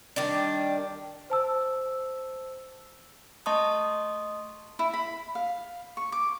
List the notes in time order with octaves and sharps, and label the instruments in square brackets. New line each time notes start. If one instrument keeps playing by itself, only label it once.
[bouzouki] D#3 G3 D4
[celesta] C5 A5 E6
[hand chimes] A3 D#5 A5 C6 C#6 D#6
[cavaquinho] E4
B5
F5
C#6
D6